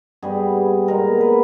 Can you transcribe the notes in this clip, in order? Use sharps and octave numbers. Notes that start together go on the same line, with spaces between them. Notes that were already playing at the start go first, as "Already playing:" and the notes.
G2 G3 B3 G#4
A#2 G#3 B3 A#4
B4